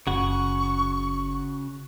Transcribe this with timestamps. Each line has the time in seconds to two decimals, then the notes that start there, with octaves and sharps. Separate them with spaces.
0.07 F#1 C#3 F#4 C#6